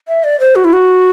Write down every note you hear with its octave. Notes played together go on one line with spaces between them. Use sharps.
E5
D5
C5
F#4
E4
F#4